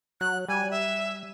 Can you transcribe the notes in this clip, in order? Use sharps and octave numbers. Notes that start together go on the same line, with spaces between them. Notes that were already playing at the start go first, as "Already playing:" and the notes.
F#3 F#6
G3 G#5
E5